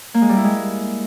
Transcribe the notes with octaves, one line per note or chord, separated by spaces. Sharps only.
A#3
G#3
G3
E4
G#3